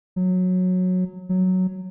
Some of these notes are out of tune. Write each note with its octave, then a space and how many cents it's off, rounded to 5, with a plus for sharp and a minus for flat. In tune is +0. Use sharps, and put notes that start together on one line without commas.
F#3 -15
F#3 +0